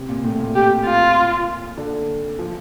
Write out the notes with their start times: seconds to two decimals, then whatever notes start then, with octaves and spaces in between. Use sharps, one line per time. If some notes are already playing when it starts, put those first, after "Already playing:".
Already playing: C3
0.09 A#2
0.24 A2
0.39 A#2
0.55 G4
0.86 F4
1.77 D3
2.39 F3